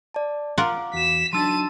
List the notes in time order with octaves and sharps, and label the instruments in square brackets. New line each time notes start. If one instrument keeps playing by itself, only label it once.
[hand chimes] D5 A5
[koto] F4 A#4 F#5 [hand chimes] F5 D6
[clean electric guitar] E2 F#4 [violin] B6 E7
[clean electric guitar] F#3 D4 D#4 [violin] A5 D#7 [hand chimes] C6 E6 A6